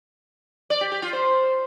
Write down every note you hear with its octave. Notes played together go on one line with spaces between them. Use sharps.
D5
G4
G4
F4
C5